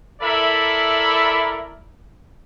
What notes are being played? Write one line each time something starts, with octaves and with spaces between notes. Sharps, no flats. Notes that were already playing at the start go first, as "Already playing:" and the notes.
E4 A4 A#4 D5 E5 B5